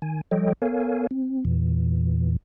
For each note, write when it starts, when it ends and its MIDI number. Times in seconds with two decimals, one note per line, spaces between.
0.02 0.21 51
0.02 0.21 80
0.31 0.53 53
0.31 0.53 55
0.31 0.53 69
0.31 0.53 73
0.31 0.53 75
0.31 0.53 79
0.62 1.07 59
0.62 1.07 69
0.62 1.07 70
0.62 1.07 73
0.62 1.07 77
0.62 1.07 80
1.11 1.44 60
1.45 2.36 40
1.45 2.36 46
1.45 2.36 52